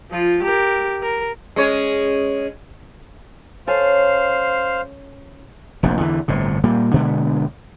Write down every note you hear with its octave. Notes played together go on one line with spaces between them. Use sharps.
F3 F4
G4 A#4
A#4
G#3 C#4 C#5
C#4 A4 C5 F5
F1 A#1 F2
E2 D3 E3
G1 A2 C3
A#2 G3 A#3
B2 D3 G#3 B3